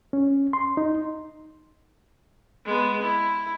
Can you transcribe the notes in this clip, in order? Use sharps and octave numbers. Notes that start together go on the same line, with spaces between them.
C#4
C6
D#4
G#3 B3
E4